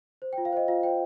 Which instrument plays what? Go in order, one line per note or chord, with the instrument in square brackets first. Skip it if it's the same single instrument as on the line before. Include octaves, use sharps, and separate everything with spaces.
[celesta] C5
F4 G5
F5
C5 D#5
F4 F5
C5 G5